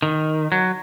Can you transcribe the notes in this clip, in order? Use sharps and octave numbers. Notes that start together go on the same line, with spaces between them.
D#3
F#3